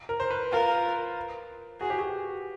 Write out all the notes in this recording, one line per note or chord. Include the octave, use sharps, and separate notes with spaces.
A#4
C5
B4
F4 A#4
F#4 G#4
G4
F#4